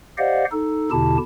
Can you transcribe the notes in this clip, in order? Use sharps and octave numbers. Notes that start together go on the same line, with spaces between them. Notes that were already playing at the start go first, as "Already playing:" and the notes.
G4 C5 D5 D#5 F5 F#5
D#4 A4
E2 B2 D3 E4 G4 A5